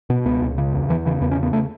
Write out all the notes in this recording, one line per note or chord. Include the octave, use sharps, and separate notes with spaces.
B2 B3
C#2 B3
C#2
C#3
E2
E2 E3
C#3 E3
E2 B3
C#4
C#3
B3
A3